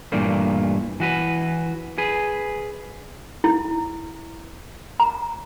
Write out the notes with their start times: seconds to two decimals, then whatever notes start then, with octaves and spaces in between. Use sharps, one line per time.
0.12 G2 A#2 E3 A3 A#3
1.00 E3 F#4 B4
1.98 G#4 B4
3.44 E4
5.00 A#5